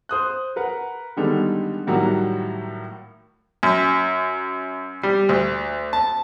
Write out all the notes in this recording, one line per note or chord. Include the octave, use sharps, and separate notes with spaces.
C5 D#6 F#6
A#4 B4 F#5
D3 D#3 G3 G#3 B3 A4
A2 D#3 F#3 G3 A#3 F#4
F#2
G3
D2
A5